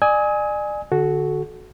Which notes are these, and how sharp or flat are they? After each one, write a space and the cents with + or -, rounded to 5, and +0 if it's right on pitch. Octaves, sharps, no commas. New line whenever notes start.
D5 +40 G#5 +0 D#6 +40
D3 +0 F#4 +0 A4 -30